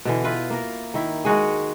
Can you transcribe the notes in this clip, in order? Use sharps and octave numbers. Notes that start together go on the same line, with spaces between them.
B2 D3 E3
E4 F4 B4
A#3 A#4
D#3 E4
G#3 D#4 F#4 G#4